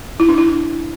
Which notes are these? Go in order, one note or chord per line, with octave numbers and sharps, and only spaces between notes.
E4
D4
E4